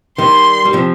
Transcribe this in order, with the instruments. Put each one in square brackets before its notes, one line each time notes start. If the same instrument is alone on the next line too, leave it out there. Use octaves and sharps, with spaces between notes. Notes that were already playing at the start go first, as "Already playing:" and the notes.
[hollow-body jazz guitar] D#3 G3 [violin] C6
[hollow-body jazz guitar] G3
C3 F3